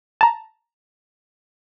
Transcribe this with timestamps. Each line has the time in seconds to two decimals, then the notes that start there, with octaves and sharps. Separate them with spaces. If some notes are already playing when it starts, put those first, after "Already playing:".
0.21 A5 A#5